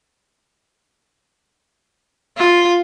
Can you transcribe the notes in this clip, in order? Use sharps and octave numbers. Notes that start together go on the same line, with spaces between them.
F4